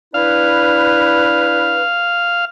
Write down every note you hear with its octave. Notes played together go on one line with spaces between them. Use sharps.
D4 E4 B4 F5